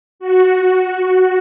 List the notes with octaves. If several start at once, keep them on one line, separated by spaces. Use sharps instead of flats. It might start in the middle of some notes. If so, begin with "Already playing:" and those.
F#4
F#4